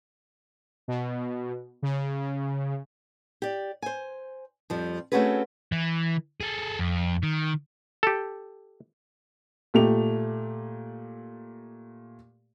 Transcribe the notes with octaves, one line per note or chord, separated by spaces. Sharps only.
B2
C#3
G4 D5
C5 G#5
F2 F3 G3
A3 C4 C#4 F#4 G#4 B4
E3
G#4 A4
F2
D#3
G4 A4
A#2 A3 G4 F7